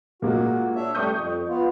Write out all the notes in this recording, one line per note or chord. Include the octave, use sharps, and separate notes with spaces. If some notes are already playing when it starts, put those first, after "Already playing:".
A#2 G#3 A#3 F#4
D4 C#5 E5
G3 A3 C#6 D#6 G6
F2
B3 F4